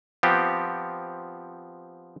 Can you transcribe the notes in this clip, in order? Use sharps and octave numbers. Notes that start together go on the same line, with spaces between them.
F3 B3 C4 G4